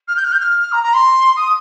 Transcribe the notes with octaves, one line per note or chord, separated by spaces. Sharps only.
F6
G6
F6
G6
F6
A#5
A#5
C6
D#6